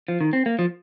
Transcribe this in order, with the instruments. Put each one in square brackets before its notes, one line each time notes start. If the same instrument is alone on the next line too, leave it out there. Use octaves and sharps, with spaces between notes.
[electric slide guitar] F3
D#3
C4
A#3
F3